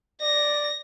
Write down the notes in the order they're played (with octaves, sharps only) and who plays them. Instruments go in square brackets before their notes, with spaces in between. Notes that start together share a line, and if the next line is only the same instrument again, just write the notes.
[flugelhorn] D5 [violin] A#6